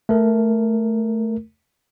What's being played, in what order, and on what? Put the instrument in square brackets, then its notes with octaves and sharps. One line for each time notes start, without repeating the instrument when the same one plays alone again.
[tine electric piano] A3 A#4